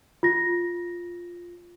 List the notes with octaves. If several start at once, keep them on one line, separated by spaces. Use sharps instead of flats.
F4 A#6